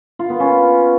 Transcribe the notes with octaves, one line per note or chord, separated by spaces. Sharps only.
F4
B3
C#4